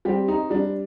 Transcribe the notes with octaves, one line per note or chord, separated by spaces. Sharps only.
G3 C4 G4
D#4
G3 D4